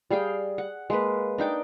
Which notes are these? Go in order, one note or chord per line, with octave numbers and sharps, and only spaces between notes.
G3 G#4 F5 G5
F#5
G#3 A#3 B4
D4 D#4 G5 D6